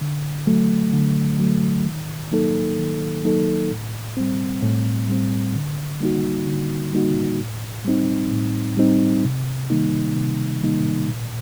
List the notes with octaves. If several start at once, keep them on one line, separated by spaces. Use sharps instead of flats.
D3
F#3 A3
D3
F#3 A3
D#3
F#3 A#3 D#4 A4
D#3
F#3 A#3 D#4 A4
A2
G3 C4
A2
G3 C4
D3
G3 A#3 D#4 F#4
D3
G3 A#3 D#4 F#4
A2
G3 C4 D#4
A2
G3 C4 D#4
C3
D#3 G3 A#3 D#4
C3
D#3 G3 A#3 D#4
A#2